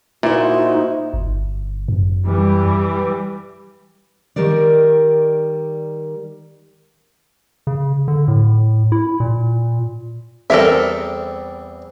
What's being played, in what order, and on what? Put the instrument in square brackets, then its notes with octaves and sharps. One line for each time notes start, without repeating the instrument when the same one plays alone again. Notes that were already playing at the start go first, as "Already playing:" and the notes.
[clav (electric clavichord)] A#2 [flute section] D#4 F#4 [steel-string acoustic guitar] E4 C5
[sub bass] G1
F#2
[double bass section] E3 G3
[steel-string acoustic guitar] D#3 G3 A#4 D5
[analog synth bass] C#3
D3
A2
E4
A#2
[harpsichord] E2 G3 C4 [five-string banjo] A4 A#4 E5